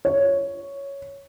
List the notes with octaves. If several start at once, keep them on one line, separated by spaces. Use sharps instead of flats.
C#5